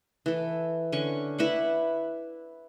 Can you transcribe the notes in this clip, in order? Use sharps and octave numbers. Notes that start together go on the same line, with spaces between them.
E3 A4
D3 C#4 C#6
E4 B4 D5 F#5